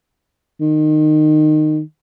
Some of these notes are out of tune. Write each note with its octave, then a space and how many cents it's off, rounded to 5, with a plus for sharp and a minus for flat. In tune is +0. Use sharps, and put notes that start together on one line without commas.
D#3 -20